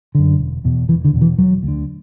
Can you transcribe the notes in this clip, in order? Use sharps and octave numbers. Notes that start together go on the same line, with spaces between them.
F#2 D3
E1
E2 B2
E1 E3
D3
E2 B2
E3
E1 F#3
D2
D3